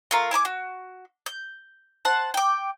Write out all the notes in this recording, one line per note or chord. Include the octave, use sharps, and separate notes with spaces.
A3 F4 A#4
E4 G#5 B5 D6
F#4
G6
C5 F#5 A5
G5 D6